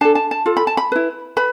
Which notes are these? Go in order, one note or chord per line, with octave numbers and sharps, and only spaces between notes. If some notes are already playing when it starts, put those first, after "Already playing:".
D4 A4 A5
A5
A5
F4 A4
B5
A5
B5
E4 B4
B4 B5